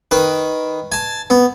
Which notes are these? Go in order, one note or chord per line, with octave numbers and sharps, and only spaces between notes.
D#3 B4
G#5 A5
B3